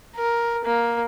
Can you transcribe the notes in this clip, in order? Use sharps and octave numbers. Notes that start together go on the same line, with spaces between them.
A#4
A#3